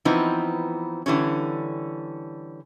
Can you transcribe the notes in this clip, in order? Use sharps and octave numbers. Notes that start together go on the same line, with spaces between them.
E3 F3 B3 C4 D#4
D3 E3 G3 C#4